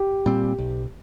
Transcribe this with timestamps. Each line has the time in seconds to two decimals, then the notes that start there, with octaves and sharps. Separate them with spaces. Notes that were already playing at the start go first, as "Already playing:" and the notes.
Already playing: G4
0.26 A#2 G3 C4
0.58 B1